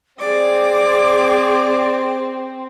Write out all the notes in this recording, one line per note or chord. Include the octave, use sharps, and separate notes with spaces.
C4 G#4 D5 D6